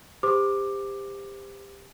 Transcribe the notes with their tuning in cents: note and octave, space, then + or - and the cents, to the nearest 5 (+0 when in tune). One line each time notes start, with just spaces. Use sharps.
G4 +25 C5 -20 D6 +10